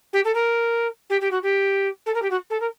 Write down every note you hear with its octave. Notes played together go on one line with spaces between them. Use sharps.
G4
A4
A#4
G4
G4
F#4
G4
A4
A#4
G4
F#4
A4
A#4